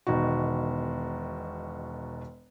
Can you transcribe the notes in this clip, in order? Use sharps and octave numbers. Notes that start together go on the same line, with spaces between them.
E1 B2 D#3 F#4